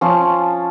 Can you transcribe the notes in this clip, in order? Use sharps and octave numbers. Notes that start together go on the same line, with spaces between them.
F3 C#4 F4 A5